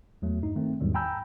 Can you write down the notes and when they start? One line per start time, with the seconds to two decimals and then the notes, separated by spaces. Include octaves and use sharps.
0.22 E2 F#3 A3
0.43 G2 D#4
0.56 D#3 A3 C4
0.81 E2 G#2 D#3 F#3 G3
0.95 G5 G#5 A#5 B5 E6 G6